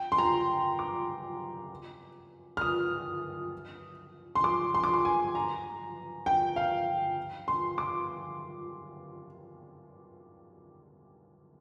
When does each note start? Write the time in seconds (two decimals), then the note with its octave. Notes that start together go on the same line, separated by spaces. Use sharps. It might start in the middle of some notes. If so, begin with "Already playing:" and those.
Already playing: G5
0.12 C6
0.18 A#5
0.79 D6
2.57 F6
2.61 D#6
4.35 C6
4.44 D6
4.74 C6
4.84 D6
4.94 C6
5.05 G#5
5.35 A#5
6.26 G5
6.56 F5
7.48 C6
7.78 D6